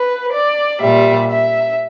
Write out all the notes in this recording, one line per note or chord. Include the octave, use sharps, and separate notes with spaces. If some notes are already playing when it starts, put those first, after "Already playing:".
Already playing: B4
D5
A#2 G3 E5
E5